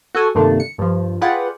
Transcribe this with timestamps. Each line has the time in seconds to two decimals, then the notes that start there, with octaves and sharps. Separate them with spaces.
0.15 F#4 A4 G#5
0.35 G2 C3 D#3 A3 A#3 D4
0.60 C#7
0.78 G2 F3
1.21 F4 G#4 B4 D5 F#5 G5